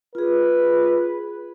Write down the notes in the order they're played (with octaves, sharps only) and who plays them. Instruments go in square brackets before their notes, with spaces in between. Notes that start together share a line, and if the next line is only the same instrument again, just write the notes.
[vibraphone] F4 G#4 [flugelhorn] B4